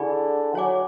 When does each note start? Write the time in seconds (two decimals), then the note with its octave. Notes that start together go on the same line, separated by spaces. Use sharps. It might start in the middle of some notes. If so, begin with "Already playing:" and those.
Already playing: D3 E4 G#4 D5 G#5 B5
0.55 F#3 C#5 G#5 D6